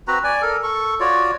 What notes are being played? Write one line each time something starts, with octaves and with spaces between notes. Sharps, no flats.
C4 F#4 B4 A#5
D5 G#5
A4 A#4
A4 C#6
F4 F#4 C#5 D5